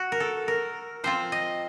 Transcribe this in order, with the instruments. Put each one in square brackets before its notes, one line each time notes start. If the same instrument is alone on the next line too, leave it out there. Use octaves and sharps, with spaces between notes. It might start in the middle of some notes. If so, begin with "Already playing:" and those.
Already playing: [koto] F#4
A#4
A4
A#4
F3 C4 F4 C5
D#5